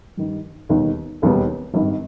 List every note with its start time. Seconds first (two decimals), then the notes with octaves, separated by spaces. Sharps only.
0.17 G2 D#3 G3
0.69 E1 D#2 D#3 G3 B3
1.22 E1 D#2 D#3 G3 B3
1.74 G#1 G2 D#3